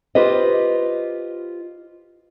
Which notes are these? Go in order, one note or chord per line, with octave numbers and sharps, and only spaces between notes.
F4 G4 B4 C5 D#5